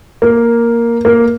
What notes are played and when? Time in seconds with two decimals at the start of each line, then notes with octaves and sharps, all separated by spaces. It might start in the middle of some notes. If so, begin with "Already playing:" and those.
0.22 A#3
1.05 A#3